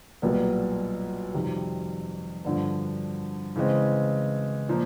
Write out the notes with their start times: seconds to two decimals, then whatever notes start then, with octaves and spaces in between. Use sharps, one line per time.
0.22 B1 A#2 G3 B3
1.34 F2 C3 D#3 G3
2.45 G2 D3 F3
3.56 C#3 E3 G#3 C4
4.69 A#2 F3 A#3